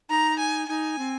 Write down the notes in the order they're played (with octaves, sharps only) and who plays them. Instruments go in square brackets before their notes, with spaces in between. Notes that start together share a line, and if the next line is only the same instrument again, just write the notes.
[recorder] D#4 [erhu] A#5
[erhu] G#5
[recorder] D#4 [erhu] G#5
[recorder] C4